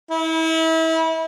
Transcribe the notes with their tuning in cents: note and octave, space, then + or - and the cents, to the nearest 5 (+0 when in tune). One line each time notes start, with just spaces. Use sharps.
E4 -35